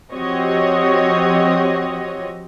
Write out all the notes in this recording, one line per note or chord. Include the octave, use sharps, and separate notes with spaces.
F3 C4 F#4 G4 C#5 D#5